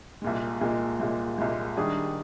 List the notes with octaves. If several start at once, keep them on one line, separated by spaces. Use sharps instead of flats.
C2 A#2 G#3
C2 A#2 G#3
C2 A#2 G#3
C2 A#2 G#3
D#3 G3 D4 G#4